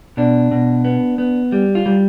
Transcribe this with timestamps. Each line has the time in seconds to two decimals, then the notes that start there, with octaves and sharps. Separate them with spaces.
0.17 B2 D4
0.51 B2
0.85 B3
1.18 B3
1.52 G3
1.75 F4
1.86 G3